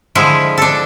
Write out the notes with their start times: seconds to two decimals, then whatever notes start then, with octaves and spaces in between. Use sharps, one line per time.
0.15 D3 F3 G#3 E4
0.58 D4 A4